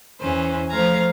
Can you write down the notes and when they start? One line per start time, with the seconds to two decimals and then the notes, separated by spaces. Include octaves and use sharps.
0.19 E2 E3 C#4 C5
0.69 F3 A3 C5 F5 A#5 G#6